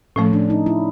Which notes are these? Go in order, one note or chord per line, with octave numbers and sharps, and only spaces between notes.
A2 F3 A3 C#4
D4
D#4
E4